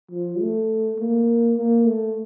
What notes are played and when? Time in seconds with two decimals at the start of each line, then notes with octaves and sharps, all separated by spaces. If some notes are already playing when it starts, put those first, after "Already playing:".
0.11 F3
0.40 A3
0.99 A#3
1.57 A#3
1.86 A3